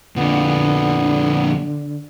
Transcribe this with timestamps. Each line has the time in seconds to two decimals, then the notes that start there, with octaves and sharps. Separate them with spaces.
0.16 F2 A#2 D3 B3